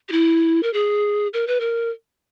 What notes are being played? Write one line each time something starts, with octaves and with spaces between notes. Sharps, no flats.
G4
E4
A#4
G#4
A#4
B4
A#4